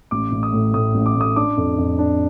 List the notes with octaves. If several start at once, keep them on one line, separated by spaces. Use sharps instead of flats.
A1 D6
A1
D#6
A2
A2 D#6
A1
D6
A2 D#6
D4 D6
F2
F2
D4